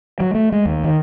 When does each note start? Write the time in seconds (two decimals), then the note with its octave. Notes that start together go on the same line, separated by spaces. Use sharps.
0.20 F#3
0.34 A3
0.52 G#3
0.65 D#2
0.84 D#3